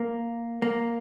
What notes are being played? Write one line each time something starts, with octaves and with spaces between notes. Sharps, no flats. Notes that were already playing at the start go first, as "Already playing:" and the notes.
Already playing: A#3
A#3